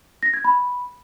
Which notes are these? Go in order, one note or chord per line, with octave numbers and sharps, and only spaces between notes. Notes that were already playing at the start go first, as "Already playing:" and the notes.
A#6
G#6
B5